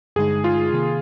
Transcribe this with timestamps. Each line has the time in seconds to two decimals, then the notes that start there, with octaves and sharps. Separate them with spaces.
0.16 G2 D3 G#3 D#4 G#4
0.44 F4
0.72 C3 D#3 A#3